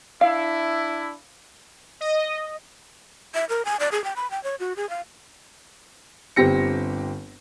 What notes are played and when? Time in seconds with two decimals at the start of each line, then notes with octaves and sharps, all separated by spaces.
0.21 D4 E4 F5
2.01 D#5
3.34 E5
3.49 A#4
3.65 G#5
3.80 D5
3.92 G#4
4.04 G5
4.16 B5
4.31 G5
4.44 C#5
4.60 F#4
4.77 G#4
4.90 F5
6.36 G1 C4 G4 A#6 C#7